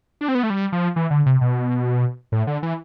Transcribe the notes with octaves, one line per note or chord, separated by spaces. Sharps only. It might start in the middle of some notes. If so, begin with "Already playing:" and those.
D4
C4
B3
A3
G3
F3
E3
D3
C3
B2
A2
D3
E3